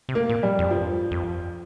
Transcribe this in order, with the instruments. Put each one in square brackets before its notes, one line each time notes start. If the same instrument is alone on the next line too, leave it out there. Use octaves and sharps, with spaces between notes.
[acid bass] C3
[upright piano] A#3
[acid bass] A#2
[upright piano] G3
[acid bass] F2
[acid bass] G2 [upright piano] F3
[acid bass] F2